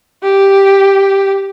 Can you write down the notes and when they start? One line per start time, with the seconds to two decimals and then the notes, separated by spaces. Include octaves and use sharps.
0.23 G4